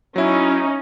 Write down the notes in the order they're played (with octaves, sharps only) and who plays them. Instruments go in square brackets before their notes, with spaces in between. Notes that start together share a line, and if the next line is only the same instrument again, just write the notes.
[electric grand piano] F#3 E4 [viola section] C#4 D#4